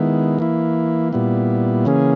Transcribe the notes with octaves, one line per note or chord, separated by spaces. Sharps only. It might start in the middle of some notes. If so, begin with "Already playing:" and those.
Already playing: D#3 G#3 B3 E4
E3 A#3 E4
A#2 G3 B3 E4
C#3 E3 A#3 C#4 G#4